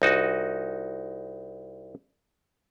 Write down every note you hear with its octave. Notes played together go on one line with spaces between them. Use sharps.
C2 D#4 F#4 G#5